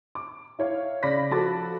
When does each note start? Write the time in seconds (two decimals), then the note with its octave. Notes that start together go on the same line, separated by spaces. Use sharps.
0.15 D6
0.59 E4 C#5 F5
1.03 C#3 D5 B5 A#6 B6
1.31 F3 F#4 A4 B5 D6 A6